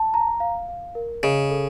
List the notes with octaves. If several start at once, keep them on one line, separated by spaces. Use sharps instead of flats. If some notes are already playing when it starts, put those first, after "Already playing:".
Already playing: A5
A#5
F5
F5
A#4
C#3 D#5
A4